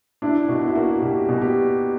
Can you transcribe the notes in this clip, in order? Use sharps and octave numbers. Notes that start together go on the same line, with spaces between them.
D4 E4
B2 F#4
E4
A#3 F#4
B2 G4
B2
G4